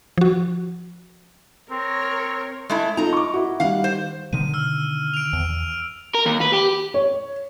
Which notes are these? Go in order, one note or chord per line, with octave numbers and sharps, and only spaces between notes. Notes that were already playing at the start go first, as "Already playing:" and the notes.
F3 F#4
C4 A#4 C#5
G#3 A3 E4
D#4 F4 A4 D#5 A#5
C#6 D6
E4 F#4
D#3 G3 F5 F#5
C5
B2 D3 D#3 D#7
E6 F6
D7 F7
E2
A#4
D#2
B4
G4
C#5